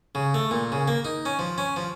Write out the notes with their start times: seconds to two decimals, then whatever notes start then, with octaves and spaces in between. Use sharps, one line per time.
0.15 C#3
0.34 A3
0.51 A#2
0.72 C#3
0.88 A#3
1.05 D#4
1.25 C#4
1.39 F3
1.58 C#4
1.76 F3